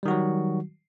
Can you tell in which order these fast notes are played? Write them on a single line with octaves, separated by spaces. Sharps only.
G3 D#3 F#4 F#3